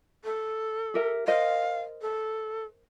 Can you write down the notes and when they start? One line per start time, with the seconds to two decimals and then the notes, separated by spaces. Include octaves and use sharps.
0.24 A4
0.94 G4 A#4 E5
1.27 A#4 C5 D#5 F5
2.02 A4